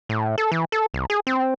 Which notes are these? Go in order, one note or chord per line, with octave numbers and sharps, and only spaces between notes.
A2
A4
E3
A4
C2
G#4
C4